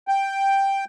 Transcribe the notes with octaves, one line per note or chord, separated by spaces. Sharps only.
G5